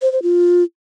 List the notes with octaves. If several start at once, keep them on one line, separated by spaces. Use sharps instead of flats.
C5
C5
F4